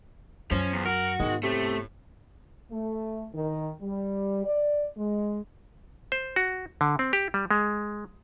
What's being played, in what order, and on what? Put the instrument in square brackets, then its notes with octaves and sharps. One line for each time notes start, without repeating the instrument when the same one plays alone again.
[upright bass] F#2 [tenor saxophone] F3 [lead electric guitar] C#4
[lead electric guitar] E2
[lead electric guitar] F#4 [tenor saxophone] A#4
[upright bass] G#2 B3 [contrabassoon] D#3 [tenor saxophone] G#3
[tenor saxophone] A2 [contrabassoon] C3 [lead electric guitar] A3
[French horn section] A3
D#3
G3
D5
G#3
[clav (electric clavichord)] C5
F#4
D3
C4
G4
G3
G#3